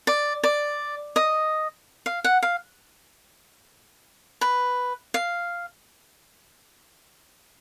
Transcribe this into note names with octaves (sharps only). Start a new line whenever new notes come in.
D5
D5
D#5
F5
F#5
F5
B4
F5